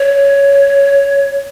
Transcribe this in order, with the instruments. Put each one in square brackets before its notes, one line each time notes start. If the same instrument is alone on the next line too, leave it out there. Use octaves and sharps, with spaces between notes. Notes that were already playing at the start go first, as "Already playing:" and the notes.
Already playing: [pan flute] C#5